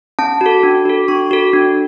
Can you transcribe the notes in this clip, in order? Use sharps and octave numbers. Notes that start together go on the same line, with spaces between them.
C#4 A5
F#4 A4
D4
F#4 A4
D4 C#6
F#4 A4
D4